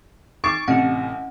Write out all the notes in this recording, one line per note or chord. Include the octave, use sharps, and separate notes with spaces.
D#4 C#6 D6 A6 D7
A1 C3 E4 D#5 F#5